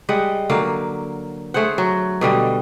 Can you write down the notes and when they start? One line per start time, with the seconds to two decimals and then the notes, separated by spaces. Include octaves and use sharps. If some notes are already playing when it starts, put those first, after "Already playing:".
0.09 G3 G#3 D#5 F#5
0.50 D3 F#3 A#3 F5
1.54 A3 G#4 C5 F#5
1.78 F#3
2.21 B2 D3 G3 D#5